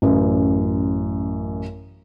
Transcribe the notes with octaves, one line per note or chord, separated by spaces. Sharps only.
A1 F#2